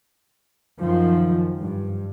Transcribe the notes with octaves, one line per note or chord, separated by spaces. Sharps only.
F#2 D#3 F3
G2